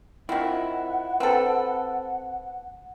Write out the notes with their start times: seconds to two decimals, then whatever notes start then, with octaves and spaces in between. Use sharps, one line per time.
0.29 D#3 C4 E4 F4 F#5
1.20 C4 A4 B4